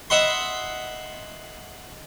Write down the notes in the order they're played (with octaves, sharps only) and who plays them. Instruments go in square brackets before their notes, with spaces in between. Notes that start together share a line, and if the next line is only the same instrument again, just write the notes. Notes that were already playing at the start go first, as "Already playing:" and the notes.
[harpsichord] D#5 E5 F#5 B5 C6